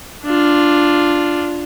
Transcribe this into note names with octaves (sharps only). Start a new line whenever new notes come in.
D4 F4